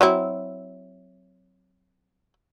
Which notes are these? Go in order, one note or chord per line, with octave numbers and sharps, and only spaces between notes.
F#3 C4 E4